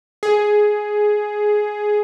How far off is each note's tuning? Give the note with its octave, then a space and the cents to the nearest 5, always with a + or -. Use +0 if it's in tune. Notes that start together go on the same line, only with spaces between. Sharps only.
G#4 +10